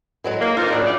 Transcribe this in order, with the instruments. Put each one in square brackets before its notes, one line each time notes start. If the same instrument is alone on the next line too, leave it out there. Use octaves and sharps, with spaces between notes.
[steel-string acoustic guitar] E3 F#3 G#3
[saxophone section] A#3
[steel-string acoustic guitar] D#3 C4 F4 [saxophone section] D#4 A#4
[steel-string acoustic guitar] G2 A#2 F#3 [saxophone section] C#3 D4
[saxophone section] D#4 E4 D5